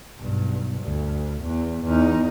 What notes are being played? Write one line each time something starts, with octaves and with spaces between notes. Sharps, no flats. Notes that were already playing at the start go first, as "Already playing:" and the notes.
B1 G2
D2
E2
E2 D#4